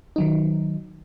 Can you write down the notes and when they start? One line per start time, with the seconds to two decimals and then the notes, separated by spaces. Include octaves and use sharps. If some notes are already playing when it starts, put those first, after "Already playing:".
0.16 D#3 F#3 D#4